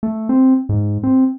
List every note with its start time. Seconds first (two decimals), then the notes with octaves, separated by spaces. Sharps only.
0.03 A3
0.29 C4
0.69 G#2
1.03 C4